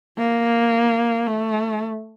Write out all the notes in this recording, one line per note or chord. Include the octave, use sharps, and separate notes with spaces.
A#3
A3